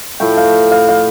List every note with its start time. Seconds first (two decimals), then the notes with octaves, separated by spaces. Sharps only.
0.20 A2 F3 A3 G5
0.37 F5
0.71 F5
0.89 F5